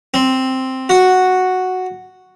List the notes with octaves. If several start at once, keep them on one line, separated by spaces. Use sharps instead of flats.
C4
F#4